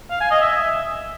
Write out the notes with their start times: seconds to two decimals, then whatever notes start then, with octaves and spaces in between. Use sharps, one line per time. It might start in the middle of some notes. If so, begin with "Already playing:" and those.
0.11 F5
0.21 G#5
0.31 D#5
0.41 E5